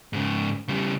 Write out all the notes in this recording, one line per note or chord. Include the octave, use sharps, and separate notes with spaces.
G#2 C#3
C#3 G3